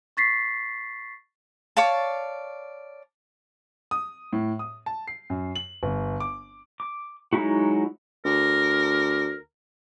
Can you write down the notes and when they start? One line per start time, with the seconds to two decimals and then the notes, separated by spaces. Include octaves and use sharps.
0.17 C#6 A6 B6 C7
1.77 C#5 D5 F5 A5
3.91 D#6
4.33 A2
4.59 D#6
4.86 A5
5.07 C7
5.30 F#2
5.55 F#7
5.83 G1
6.20 D6
6.80 D6
7.33 F#3 G#3 D#4 E4 F#4
8.25 D2 A#4